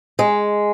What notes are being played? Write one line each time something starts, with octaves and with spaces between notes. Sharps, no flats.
G#3